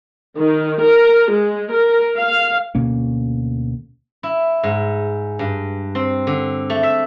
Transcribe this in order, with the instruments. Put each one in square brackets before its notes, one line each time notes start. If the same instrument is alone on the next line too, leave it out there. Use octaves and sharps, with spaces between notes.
[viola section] D#3
A#4
G#3
A#4
F5
[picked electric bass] D2 B2 A#3 C#4
[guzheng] E4
G#2
G2
C4
D3
A3
E5